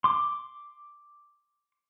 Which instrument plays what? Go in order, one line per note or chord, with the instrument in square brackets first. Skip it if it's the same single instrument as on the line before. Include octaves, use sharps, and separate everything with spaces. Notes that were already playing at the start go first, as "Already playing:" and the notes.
[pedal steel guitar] C6 D6